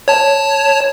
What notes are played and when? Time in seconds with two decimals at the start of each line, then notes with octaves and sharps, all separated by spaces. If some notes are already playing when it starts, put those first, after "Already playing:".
0.08 C#5 A5